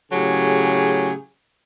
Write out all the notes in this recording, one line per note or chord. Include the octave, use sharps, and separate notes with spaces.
A2 C#3 F#3 G4 G#4